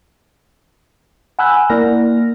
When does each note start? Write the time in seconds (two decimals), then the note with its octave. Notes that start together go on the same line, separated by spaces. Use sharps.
1.39 F#5 G#5 B5 E6 F#6 G6
1.70 A#3 E4 A#4 D5 F6 A#6